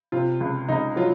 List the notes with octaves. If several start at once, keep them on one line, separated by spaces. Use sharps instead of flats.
C3 F4
C#2
C#2 D#4
F#3 F4